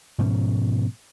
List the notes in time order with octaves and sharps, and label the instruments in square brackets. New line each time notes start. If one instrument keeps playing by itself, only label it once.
[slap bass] G#2 B2 F3 C#4